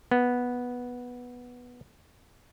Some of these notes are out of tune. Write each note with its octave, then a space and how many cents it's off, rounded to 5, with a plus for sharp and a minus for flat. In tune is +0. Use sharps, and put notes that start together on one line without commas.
B3 -5